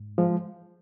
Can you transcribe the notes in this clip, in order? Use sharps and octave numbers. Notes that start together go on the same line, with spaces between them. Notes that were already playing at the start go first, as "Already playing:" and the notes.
Already playing: G#2
F3 G#3